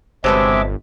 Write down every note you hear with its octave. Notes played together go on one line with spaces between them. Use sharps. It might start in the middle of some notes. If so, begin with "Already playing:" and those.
G1 C3 F#3 G#3 A4 B4 E5 D6